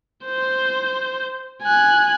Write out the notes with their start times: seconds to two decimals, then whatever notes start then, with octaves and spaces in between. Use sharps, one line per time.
0.25 C5
1.62 G#5 F#6